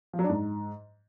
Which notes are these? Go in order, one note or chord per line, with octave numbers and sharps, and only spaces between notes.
F3
F#3
D4
G#2